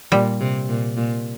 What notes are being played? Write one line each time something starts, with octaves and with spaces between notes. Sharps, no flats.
A#2 G3
C3
A#2
A#2